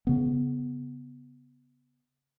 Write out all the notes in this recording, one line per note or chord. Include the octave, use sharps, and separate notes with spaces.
C#3 B3